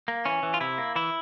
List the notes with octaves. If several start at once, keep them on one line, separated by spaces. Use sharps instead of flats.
A#3
E3 C#4
E3
F4
C3 E4
A#3
E3 E4